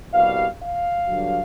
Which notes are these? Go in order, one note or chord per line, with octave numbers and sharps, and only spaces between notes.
C2 B2 G3 F5
F5
G2 D3 F#3